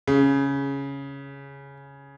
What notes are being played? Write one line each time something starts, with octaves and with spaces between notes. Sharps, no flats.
C#3